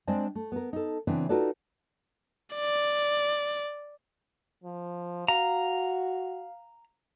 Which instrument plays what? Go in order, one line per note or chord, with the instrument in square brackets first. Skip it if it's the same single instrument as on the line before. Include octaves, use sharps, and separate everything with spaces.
[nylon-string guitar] G#3 C4 D4 C5 D5 G#5
A3
B3 A#4
D#4 A4
C#3 E3 B3 C4 D4
D#4 F4 F#4 A4 B4 D5
[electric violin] D5
[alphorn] F3
[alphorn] F#4 [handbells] F5 [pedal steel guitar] A#5